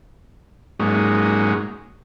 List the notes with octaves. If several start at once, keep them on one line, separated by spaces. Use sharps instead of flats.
G#2 F#3 G#3 A#3 C#4 D#4